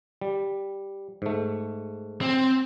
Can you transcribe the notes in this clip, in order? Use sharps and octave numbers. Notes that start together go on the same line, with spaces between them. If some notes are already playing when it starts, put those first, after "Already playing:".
G3
G#2 A3
C4